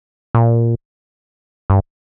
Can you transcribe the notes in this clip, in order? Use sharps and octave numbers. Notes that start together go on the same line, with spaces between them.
A#2
G2